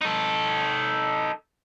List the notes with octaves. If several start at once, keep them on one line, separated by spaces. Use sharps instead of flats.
D#4 A4